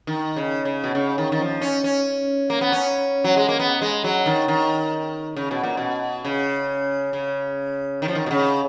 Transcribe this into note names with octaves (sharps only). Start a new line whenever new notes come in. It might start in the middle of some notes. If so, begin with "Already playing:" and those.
D#3
C#3
C#3
B2
C#3
D#3
D#3
F3
C#4
C#4
A#3
B3
C#4
F#3
G#3
A#3
B3
G#3
F#3
D#3
D#3
C#3
B2
A#2
B2
C#3
C#3
D#3
F3
D#3
B2
C#3